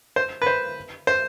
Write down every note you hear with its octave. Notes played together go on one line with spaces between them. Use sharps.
C5
B4
C5
C5